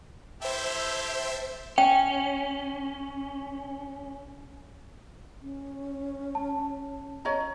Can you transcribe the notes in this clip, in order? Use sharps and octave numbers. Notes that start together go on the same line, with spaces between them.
E4 G4 A4 C5 E5
C#4 G5
C#4
A5
C#5 D#5 A#5